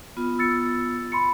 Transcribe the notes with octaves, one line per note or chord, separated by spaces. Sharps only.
B3 F4
E6 A6 C#7
B5 C6 C#7